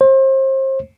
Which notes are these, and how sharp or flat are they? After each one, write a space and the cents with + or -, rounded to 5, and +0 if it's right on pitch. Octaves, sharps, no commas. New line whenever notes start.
C5 +35